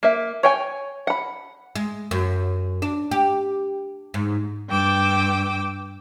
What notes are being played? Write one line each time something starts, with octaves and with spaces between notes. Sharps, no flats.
A#3 E5
C#5 G5 G#5
F#5 B5
G#3
F#2
D4
G4
G#2
G2 G5 D6 E6